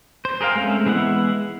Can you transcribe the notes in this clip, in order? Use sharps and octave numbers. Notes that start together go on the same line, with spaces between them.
C5
G#4 A#4 B4 F5 G5
G#3 A3 C4 C#4
E3 G#3 B3 E4 F#5